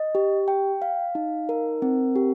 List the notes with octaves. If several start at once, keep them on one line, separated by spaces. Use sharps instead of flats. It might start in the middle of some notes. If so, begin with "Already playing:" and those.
Already playing: D#5
G4
G5
F5
D#4
A#4
C4
G4